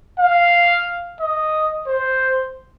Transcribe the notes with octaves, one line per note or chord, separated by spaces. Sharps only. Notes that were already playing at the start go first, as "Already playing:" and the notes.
F5
D#5
C5